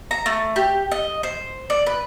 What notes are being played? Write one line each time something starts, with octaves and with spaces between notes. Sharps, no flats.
A#5
A3
G4
D#5
C5
D5
B4